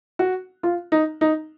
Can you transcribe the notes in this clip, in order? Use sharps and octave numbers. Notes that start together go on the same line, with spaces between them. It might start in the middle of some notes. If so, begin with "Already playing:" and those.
F#4
F4
D#4
D#4